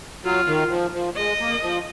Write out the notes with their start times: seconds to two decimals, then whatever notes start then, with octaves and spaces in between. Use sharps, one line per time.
0.25 F#3 F4
0.48 D#3
0.71 F3
0.94 F3
1.17 G#3 D#5
1.40 A#3
1.63 F3